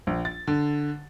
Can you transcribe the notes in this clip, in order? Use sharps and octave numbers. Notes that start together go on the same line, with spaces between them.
A#1
A6
D3